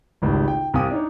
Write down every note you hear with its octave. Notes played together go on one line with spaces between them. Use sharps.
G#1 C#2 A2 G3
G5
C2 C3 F5 G5 G#5 D#6
D4 D#4 C#5